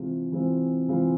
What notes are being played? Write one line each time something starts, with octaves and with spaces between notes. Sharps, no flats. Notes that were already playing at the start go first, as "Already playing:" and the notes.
Already playing: C3 E3 G#3 C4 F4
C3 E3 G#3 C4 F4
C3 E3 G#3 C4 F4